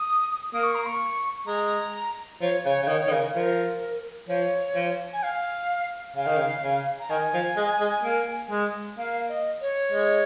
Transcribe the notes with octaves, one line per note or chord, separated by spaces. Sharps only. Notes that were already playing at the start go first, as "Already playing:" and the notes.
Already playing: D#6
A#3 D#6
C#6
A#5
C#6
G#3 A#5
F3 C#5
C#3 C#5
C#3
D#3 C#5
C#5
D#3
C#3 A#4
F3 A#4
F3 C#5
F3
G#5
F5
C#3 F5
D#3
C#3
C#3
A#5
D#3 G#5
F3
G#3
G#3
A#3
G#3
A#3 F5
D#5
C#5
G#3